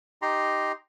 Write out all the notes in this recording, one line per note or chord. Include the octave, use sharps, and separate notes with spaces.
D#4 G4 A#5 C6